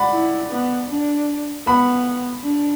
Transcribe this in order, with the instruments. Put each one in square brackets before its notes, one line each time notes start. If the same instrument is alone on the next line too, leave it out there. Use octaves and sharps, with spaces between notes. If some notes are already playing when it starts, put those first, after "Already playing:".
Already playing: [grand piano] D5 F#5 B5
[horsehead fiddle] E4
B3
D4
[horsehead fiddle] B3 [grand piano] B5
[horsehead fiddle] D4